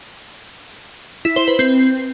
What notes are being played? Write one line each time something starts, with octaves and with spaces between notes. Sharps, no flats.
E4
C5
B4
C4